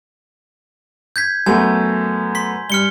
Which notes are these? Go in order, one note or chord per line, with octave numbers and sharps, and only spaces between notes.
G6 G#6 B6
F#2 A3 B3 G#5
C6 B6
G2 F6 C#7 G7